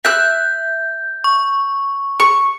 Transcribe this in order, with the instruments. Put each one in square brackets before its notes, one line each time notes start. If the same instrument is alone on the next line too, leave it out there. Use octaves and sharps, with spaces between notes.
[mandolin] E5 F#6 [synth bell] G6
[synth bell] C#6
[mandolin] C#6